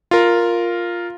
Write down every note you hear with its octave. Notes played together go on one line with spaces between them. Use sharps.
F4 A#4